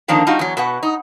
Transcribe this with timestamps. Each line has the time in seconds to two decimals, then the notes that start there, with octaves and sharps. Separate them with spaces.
0.08 D3 D#3 F3 A#3 C4 D4
0.27 G3 D#4 F4 F#4
0.39 E2 F#3
0.57 B2 B4 F#5
0.83 D#4